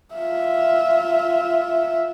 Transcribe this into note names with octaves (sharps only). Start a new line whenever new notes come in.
F4 E5